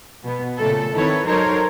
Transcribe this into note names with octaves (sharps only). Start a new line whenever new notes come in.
B2 B3
A#2 C#3 A3 A4
D#3 C4 E4 A4 B4 C#5
F#3 D#4 A4 A#4 C5 C#5